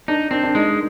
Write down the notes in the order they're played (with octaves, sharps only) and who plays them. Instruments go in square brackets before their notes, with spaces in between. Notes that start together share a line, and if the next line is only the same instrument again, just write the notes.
[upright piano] D4 [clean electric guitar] D#4
[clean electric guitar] C4 [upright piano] D4
[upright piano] D4
[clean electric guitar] G#3 [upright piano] D#4